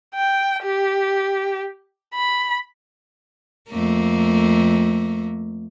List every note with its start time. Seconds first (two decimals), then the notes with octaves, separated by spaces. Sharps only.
0.15 G5
0.63 G4
2.14 B5
3.69 F2 A3 A#3